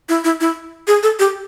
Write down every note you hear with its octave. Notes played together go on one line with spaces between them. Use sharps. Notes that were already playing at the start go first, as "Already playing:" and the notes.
E4
E4
E4
G#4
A4
G4